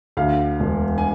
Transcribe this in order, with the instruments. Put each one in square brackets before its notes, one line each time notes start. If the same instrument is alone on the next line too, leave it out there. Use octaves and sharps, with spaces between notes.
[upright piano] D2 F5
E1
G#5